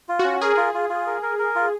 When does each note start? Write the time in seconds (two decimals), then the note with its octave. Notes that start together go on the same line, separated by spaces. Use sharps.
0.09 F4
0.19 C#4 F#4
0.41 G#4 A#4
0.57 F4
0.74 F4
0.90 F4
1.07 A#4
1.22 A#4
1.39 A#4
1.55 F4